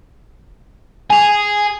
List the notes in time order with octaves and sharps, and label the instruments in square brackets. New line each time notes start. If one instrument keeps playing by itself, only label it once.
[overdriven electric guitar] G#4 [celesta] G#5 F7